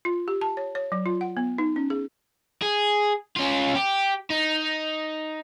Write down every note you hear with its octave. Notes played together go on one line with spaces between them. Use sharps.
F4
G4
A5
C#5
C#5
F#3
F4
F#5
B3
D#4
C#4
G#4
G#4
C#4 F4
G4
D#4